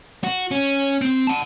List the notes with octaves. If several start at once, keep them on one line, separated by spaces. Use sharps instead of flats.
F#4
C#4
C4
F#5 A5